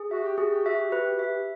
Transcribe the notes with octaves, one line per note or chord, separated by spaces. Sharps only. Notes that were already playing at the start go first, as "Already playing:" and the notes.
Already playing: G#4
F#4 E5
G4
F#4 G#4
G4
F#4 E5
G4
F#4 B4
G4
F#4 E5
G4